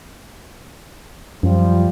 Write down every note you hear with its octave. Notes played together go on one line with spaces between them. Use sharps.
F#2 F3 G3